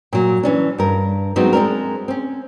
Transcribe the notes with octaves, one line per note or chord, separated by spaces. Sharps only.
A#2 F#3
E3 C#4 D4
G2 A#4
F#3 G#3 B3 C4 D4 D#4
G#3 C4 D4 A#4
C4 C#4